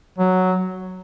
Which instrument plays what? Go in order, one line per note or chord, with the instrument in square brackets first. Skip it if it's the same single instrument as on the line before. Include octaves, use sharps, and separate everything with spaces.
[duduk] F#3